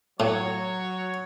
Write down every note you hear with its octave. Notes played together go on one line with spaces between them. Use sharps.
A2 F#3 C#5